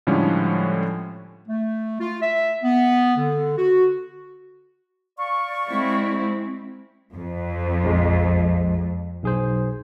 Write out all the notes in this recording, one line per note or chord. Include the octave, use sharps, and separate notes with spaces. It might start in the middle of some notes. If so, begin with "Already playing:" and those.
A2 D3 F3 G3 G#3 C#4
A3
F4
E5
B3
D3
F#4
D5 F5 C#6
G#3 C4 E4
F2
A#1 F3 G#3
B1 G#4 C5